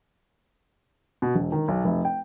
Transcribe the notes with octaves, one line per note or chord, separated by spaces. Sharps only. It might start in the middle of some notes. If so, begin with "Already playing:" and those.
B2
E1
D#3
B1
F1
G5